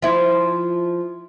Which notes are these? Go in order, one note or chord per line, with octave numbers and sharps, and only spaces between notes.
F3 E4